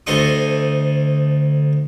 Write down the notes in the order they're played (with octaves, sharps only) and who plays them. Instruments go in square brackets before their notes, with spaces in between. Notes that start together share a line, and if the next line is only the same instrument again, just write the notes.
[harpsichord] D2 A4 C5 D#5 C#6 D#6